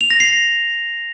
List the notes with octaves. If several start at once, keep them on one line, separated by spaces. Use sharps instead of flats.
F7
A#6
C7